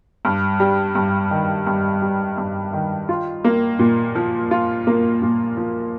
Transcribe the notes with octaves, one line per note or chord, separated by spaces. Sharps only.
G2
G3
G2
D#3
G2
G3
G2
D#3
F4
A#3
A#2
F3
F4
A#3
A#2
F3